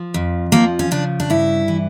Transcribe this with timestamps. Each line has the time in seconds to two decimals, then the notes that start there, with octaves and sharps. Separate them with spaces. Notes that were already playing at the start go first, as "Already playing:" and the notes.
Already playing: F3
0.14 F2
0.52 F3 A#3
0.79 C#4
0.91 C#3 D4
1.20 D4
1.30 G2 E4
1.68 E3